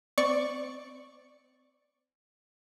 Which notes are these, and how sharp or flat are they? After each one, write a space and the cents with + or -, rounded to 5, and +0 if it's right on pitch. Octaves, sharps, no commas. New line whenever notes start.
C4 -30 D5 +0 C#6 +0